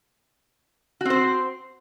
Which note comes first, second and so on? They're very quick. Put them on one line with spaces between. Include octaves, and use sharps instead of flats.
F#4 C4 C5